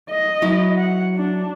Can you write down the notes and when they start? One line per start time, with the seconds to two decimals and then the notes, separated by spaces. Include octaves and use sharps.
0.10 D#5
0.42 F#3 E4
0.78 F#5
1.16 D4